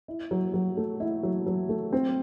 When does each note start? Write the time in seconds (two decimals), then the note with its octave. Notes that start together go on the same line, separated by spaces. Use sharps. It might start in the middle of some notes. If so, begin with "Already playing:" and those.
0.08 E4
0.31 F#3
0.54 F#3
0.77 A3
1.00 E4
1.23 F#3
1.46 F#3
1.69 A3
1.93 C4